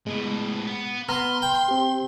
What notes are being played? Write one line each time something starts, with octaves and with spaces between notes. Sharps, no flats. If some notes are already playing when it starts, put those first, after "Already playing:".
A2 G#3 B3
B3
B3 A#5 C6 F6
G5
C4 G4